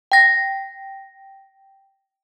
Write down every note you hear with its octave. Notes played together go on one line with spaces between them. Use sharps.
G5 A#6